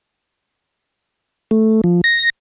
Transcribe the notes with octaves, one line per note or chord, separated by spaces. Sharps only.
A3
F3
A#6